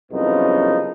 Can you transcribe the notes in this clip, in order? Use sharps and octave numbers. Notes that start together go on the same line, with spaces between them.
C2 F#2 C#3 F3 B3 D#4